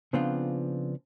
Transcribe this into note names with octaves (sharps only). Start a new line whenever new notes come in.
C#3 F3 B3 C4 D4 F4